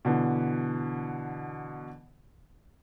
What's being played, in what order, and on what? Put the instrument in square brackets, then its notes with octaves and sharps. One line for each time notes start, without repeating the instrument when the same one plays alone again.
[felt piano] B2 D3 E3